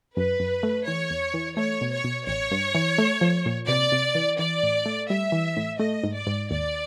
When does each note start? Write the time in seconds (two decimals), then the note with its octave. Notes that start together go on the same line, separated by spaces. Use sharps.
0.17 F#2 B4
0.40 F#2
0.63 A3
0.87 E3 C#5
1.10 E2
1.34 E3
1.57 A3 C#5
1.81 B2
1.93 C#5
2.04 B2
2.27 A1 C#5
2.51 G2
2.75 E3
2.98 A3
3.21 F3
3.46 A#2
3.68 C3 D5
3.92 C3
4.15 E3
4.39 E3 D5
4.63 A2
4.86 A3
5.09 G3 E5
5.32 E3
5.57 A2
5.79 A3 D#5
6.04 G#2
6.16 D5
6.27 G#2
6.51 D#2 D5